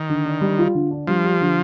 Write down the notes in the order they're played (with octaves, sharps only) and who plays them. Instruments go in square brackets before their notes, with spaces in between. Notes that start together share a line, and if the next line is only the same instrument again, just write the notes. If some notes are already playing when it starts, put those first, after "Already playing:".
Already playing: [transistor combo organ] D#3
[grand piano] D3
D4
G3
F4
D3
D4
[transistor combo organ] F3 [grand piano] G3
[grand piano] G4
D3